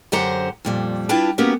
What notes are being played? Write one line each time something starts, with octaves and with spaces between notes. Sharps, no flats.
F#2 D3 G4 C5 F#5 A#5
F2 A#2 G3
D4 E4 F4 B4 G5 A5
A#3 B3 C#4 F#4 G4 A#4